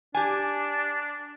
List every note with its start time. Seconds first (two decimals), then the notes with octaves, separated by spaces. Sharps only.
0.15 D4 G4 G#5